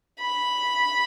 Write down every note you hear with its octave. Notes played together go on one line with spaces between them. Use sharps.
B5